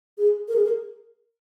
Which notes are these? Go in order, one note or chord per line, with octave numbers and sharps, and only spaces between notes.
G#4
A#4
G#4
A#4